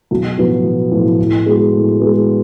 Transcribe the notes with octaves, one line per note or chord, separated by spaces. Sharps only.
B1
A2 F3 B3 F#4
B1
A2 F3 B3 F#4
A2
G#3 B3 F#4
A2
G#3 B3 F#4